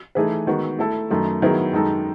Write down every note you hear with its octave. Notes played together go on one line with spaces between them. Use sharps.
E3 A3 D#4 G#4 B4
D#3 G#3 B3 F#4
A3 E4 A4
F#2 D#3 A3
D#3 F#3 B3 E4 G#4
F#2 D#3 G#3 D#4 A4